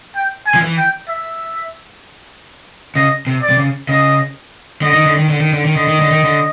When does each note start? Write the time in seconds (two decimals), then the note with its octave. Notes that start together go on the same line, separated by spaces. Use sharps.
0.15 G5
0.47 G#5
0.55 F3
0.62 E3
0.77 G5
1.08 E5
2.95 C#3 D#5
3.27 C3
3.42 D5
3.50 C3
3.58 C#3
3.89 C#3 D#5
4.82 D3 D#5
4.93 D#3
5.06 D3
5.17 D#3
5.29 D3
5.41 D#3
5.53 D3
5.65 D#3
5.76 D3 D#5
5.88 D#3
6.00 D3
6.11 D#3
6.24 D3